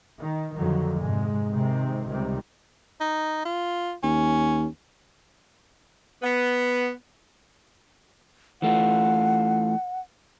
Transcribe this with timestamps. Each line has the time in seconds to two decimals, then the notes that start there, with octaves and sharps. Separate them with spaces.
0.19 D#3
0.56 F2 D3 D#3 F3 F#3
0.97 G#2 C3 G#3
1.52 C3 D#3 G#3 C4
2.07 C#2 C3 D#3 G3
3.01 D#4
3.45 F4
4.03 D#2 C#4
6.22 B3
8.62 E3 A3 F4 F#5